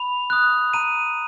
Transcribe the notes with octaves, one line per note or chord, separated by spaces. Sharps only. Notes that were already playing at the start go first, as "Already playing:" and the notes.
Already playing: B5 F7
D#6 F#6
A#5 D#7